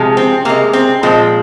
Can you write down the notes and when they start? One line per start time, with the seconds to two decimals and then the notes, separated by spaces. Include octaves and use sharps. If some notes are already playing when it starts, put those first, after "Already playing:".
Already playing: C3 F3 G#3
0.17 C4
0.45 C3 G#3 A#3
0.73 C4
1.03 A#2 F3 G#3 C4